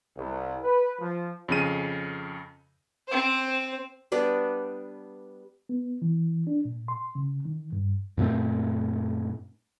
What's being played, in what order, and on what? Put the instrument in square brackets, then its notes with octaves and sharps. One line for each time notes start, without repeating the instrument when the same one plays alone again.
[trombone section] C2
B4
F3
[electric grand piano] F2 C#3 D#7
[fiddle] C4 C5
[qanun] G3 B3 D4
[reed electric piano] B3
E3
D4
A#2
C6
C#3
D#3
G2
[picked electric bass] F#2 A#2 A3 C4